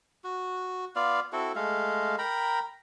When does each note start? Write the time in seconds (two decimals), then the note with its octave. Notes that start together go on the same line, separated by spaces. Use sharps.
0.24 F#4
0.96 B3 F4 D5 F5
1.33 C4 E4 F#4 A4
1.55 G#3 A3 F5
2.19 A#4 G5 A#5 B5